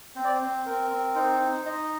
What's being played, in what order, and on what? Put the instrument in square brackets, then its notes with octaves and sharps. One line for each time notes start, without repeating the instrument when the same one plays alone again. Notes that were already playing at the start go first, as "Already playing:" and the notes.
[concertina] C4 C5
D5
C5
C4
C4 A#4
C4
D#4 C5
D#4
D#4 D#5